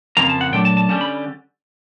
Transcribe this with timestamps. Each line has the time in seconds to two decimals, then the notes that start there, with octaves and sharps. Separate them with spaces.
0.17 F2 C#3 F3 A#3 A#5
0.29 A5
0.41 F#5
0.52 A#2 F#3 A3 D4 G5
0.65 A5
0.77 A5
0.89 D3 G3 A#3 C#4 A5
1.01 B5